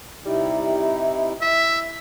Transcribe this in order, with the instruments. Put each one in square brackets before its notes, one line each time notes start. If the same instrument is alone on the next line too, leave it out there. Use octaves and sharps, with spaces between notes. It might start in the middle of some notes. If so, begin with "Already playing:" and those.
[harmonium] C3 D#4 E4 [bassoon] G3
[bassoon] E4 [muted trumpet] E5